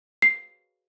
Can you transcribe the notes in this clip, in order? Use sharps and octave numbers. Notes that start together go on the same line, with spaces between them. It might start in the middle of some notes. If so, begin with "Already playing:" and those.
C7